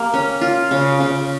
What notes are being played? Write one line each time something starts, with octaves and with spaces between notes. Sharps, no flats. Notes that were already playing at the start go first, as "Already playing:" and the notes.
Already playing: A#3 G4
C#4
F4
C#3
C#3